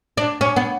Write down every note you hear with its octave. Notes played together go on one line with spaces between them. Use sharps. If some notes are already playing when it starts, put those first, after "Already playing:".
D4
C#4
B3